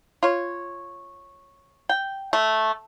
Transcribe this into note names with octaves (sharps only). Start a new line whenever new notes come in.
F4 C#5
G5
A3